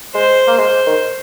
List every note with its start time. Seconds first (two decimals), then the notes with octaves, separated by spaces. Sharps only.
0.15 G#3 C5
0.47 A#3
0.58 G#3 C5
0.86 D#3